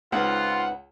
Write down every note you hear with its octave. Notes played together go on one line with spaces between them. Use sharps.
C#2 C4 D#4 F4 B4 F#5